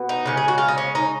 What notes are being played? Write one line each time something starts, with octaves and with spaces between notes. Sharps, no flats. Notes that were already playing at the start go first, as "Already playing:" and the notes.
Already playing: B2 B3
D#4
C#3 G#3 C#4
G#4
F#4
F4
D#4
C#4
D#4